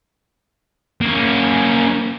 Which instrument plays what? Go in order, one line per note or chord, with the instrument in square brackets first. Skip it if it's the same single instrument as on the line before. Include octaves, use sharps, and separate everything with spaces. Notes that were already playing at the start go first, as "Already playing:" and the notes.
[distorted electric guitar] A#3 C#4